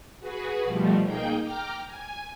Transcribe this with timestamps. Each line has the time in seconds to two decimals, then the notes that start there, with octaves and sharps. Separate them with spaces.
0.20 F#4 G#4 B4
0.65 B2 F3 G3 A3
1.04 A#3 D#4 G#4 G5 G6
1.41 G5 A#5 D6 F6
1.86 G#5